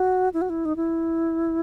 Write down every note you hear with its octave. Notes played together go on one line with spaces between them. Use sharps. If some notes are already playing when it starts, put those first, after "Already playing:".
Already playing: F#4
E4
F#4
E4
D#4
E4